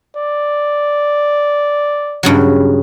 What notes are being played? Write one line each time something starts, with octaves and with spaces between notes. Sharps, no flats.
D5
G2 C#3 F#3